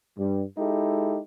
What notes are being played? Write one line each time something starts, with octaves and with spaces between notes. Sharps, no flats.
G2 G3
G#3 D#4 E4 G4 A4